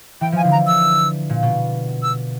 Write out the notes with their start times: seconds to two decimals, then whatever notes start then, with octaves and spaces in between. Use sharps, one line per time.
0.21 E3 G5
0.32 F3 G#5
0.44 D3 E3
0.52 A#5
0.67 E6
1.30 A#2
1.43 B2
2.03 E6